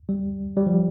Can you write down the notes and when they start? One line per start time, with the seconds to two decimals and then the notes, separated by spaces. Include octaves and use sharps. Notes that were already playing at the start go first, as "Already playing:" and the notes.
0.09 G3
0.57 G3
0.66 F3